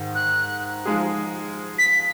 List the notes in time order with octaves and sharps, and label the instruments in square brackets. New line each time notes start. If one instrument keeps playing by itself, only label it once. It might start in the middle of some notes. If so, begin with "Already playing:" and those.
Already playing: [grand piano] G#2 D#3
[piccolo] F#6
[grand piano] F3 G#3 D#4 G#4
[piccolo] B6